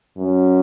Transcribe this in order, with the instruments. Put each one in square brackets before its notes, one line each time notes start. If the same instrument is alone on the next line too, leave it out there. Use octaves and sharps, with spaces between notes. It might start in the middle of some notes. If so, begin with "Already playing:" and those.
[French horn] F#2